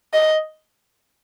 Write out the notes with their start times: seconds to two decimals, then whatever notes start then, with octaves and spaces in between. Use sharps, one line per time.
0.14 D#5